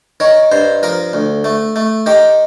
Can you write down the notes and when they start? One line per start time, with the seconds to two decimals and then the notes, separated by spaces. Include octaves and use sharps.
0.20 D#3 C#5
0.52 G2 C5
0.83 F3 A#4
1.13 D2
1.44 A3
1.76 A3
2.06 D#3 G4